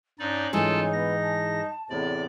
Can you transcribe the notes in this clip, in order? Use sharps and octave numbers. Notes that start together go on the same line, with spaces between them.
G2 C#4 D#4 D5
G#2 E3 G#3 D#4 F4 A4 A5
B3 A#6
A5
E2 A2 C3 D5